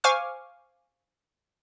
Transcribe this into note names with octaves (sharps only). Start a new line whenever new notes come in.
C5 F5 G#5 C#6 D6 F6